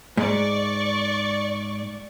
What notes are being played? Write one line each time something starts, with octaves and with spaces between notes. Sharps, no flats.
G#2 D5 C#6